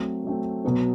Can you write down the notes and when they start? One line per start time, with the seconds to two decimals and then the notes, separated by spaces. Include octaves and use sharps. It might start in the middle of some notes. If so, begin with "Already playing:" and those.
Already playing: F#3 A3 C4
0.24 F#3 A3 C4
0.65 B2 F#3 B3